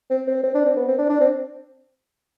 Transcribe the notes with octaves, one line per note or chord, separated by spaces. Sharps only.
C4
C4
C4
D4
C4
B3
C4
D4
D4
C4